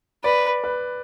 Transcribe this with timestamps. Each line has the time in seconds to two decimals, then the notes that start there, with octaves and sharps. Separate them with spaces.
0.24 B4 D5
0.64 B4